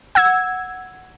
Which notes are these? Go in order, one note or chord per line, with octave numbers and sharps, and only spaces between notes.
F#5 E6 G#6